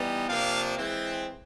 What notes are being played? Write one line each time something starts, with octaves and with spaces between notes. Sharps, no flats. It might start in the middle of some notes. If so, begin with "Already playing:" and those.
Already playing: E3 G3 B3 D#4
C3 F3 A#3 D4 F5
E3 G#3 C4